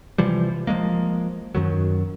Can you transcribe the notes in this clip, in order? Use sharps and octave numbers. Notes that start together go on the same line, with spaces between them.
C3 E3 F3 G3
F3 F#3 G#3 A#3
F#2 D#3 F#3